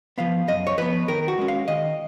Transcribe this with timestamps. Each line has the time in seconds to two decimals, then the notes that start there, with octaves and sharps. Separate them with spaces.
0.18 F3 B3 F5
0.48 F#2 D#5
0.67 C#5
0.78 F3 B3 B4
1.08 D#3 A#4
1.28 F#4
1.38 G#3 C#4
1.48 F5
1.68 D#3 D#5